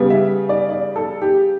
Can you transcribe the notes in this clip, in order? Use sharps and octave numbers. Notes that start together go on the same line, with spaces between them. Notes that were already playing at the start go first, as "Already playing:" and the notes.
Already playing: C#3 G3 B3
E5
D5
D5
A4
G4